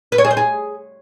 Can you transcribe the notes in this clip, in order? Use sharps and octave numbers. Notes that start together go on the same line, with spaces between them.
B4
C#5
G#4
C5
G#4